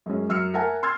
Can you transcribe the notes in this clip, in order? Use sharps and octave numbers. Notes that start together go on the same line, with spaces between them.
F#2 G#3 C#4
F#2 E6 F6 C#7
A#4 E5 F#5 G#5 A5
C6 E6 F6 G#6 A6